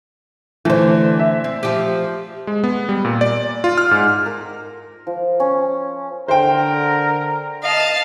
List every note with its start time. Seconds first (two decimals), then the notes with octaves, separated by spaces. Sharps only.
0.65 D3 E3 A3 C5
1.19 E5
1.44 C4
1.63 F3 G4
2.47 G#3
2.64 B3
2.89 G3
3.05 A#2
3.21 D5
3.64 F4
3.78 F6
3.91 G#2
4.26 A#4
5.07 F3
5.40 C#4
6.28 D3 A#4 C5 G5
7.63 D#5 F5 A5